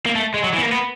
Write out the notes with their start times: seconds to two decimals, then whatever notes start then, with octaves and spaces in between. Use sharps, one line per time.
0.06 A#3
0.15 A3
0.34 G#3
0.44 F#3
0.53 E3
0.58 B3
0.62 A#3
0.72 B3